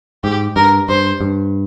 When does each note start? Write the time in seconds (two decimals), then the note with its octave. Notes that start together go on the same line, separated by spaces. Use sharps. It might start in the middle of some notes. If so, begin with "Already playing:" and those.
0.24 G#2 G4
0.56 G2 A#4
0.89 G2 C5
1.21 G2